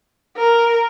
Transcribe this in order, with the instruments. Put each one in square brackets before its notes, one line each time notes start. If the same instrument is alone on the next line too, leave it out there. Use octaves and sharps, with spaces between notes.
[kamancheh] A#4